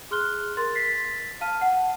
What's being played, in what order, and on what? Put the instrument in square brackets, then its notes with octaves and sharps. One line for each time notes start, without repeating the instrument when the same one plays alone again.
[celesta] G#4 C6 F6 F#6 G7
A#4 C6 A6
A6 B6 C7
F5 A5 F6 D#7
F#5